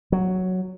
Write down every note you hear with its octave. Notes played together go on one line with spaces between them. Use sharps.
F#3